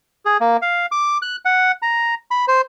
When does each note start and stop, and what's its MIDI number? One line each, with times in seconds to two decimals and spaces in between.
0.25 0.37 68
0.41 0.57 58
0.62 0.86 77
0.92 1.18 86
1.22 1.36 90
1.45 1.72 78
1.82 2.15 82
2.31 2.45 83
2.48 2.61 72